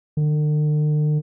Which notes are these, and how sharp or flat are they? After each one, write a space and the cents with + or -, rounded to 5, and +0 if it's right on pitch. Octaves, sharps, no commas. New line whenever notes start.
D3 +45